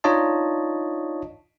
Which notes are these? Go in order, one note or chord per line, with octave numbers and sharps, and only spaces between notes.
D4 D#4 F4 C#5 D#5 A5